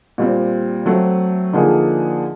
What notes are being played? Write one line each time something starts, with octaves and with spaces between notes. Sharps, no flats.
A#2 G3 C4
F#3 A3 C4
D3 F3 A#3 D#4 G#4